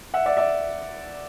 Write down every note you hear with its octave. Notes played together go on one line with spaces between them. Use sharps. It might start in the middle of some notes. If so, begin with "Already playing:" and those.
E5 F#5
D5 E5
D5 E5